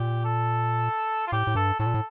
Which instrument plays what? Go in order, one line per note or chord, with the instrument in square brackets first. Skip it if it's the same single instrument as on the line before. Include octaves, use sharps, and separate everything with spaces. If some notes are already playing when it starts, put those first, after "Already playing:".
Already playing: [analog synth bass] A#2 [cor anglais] G4
[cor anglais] A4
F4
[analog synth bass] A2 [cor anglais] G4
[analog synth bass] A2
[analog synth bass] G2 [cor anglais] A4
[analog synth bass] A2 [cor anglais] A4
[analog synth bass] A#2
A2